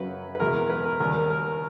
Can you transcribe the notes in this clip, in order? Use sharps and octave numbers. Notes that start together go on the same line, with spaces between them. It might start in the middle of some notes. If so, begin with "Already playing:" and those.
Already playing: F#2 C#3 F#3 B4
B4
E2 B2 G#3 A#4
B4
A#4
D#2 D#3 G3 A#4
A#4